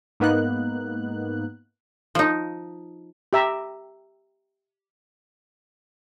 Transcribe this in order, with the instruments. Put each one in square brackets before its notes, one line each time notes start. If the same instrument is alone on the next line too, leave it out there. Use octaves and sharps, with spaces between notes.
[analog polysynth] G#2 A#3 B3 D#4 F#6
[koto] F3 D#4
[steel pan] G4 E5 A#5